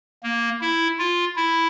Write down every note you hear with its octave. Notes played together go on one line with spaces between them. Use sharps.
A#3
E4
F4
E4